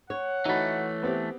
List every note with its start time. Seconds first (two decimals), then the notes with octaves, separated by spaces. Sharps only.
0.10 C#5 F#5
0.45 E3 A3 D#4 F#4 B5
1.03 B3 C4 G4